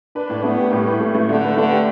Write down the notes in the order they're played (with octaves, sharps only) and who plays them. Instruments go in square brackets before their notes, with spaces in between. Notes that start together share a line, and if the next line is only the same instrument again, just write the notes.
[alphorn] D4 [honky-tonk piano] B4
[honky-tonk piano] A2
[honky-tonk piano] A3 [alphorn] B3
[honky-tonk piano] G4
[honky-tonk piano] A2 [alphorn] G3
[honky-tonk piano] B4
A3
A3
[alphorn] D3 [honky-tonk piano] A3
[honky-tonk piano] B4
[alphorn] D3 [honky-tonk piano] A3
[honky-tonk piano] G4